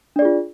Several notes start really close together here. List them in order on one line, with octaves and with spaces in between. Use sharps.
D4 D5 G#4 F4